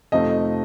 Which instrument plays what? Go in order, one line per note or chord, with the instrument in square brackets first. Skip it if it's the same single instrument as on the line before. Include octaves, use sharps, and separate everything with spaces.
[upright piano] F2 C3 F3 A3 D#4 D#5